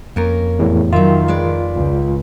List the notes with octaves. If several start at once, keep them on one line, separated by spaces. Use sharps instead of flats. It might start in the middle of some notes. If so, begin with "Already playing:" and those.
F2 A#3 C#4 A#4
E2 A2
D#3 F#3 F4 E5
G#3 B4 D5
C#2